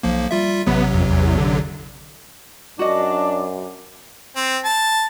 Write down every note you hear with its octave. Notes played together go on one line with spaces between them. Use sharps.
B1 F3 A#3
G3 F4 E5
A1 C3 F#3 B3
F2
E2
D3
F#2 D4 F#4 D#5 D6
C4
A5